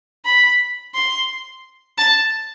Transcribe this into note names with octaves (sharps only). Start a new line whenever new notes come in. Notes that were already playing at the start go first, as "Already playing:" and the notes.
B5
C6
A5